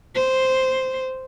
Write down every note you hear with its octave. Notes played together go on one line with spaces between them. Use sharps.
C5